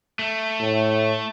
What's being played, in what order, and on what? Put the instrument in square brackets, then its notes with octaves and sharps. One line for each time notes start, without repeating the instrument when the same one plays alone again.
[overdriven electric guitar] A3
[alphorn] A2